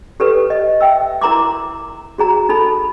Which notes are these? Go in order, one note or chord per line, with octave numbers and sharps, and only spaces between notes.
G4 A4 B4
D#5
E5 G5 E6
E4 A#4 A#5 C6 D6
F#4 G#4 A#5
D#4 A4 B5